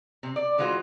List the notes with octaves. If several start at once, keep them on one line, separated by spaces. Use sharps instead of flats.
C3 C4
D5
E3 G#3 F4 F#4 C5